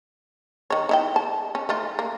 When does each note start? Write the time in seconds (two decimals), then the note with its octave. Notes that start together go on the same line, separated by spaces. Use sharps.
0.70 D#3 C#5
0.89 D#4 E4 G5
1.16 A5
1.55 C#4
1.69 A3 D#4 F4
1.99 A#3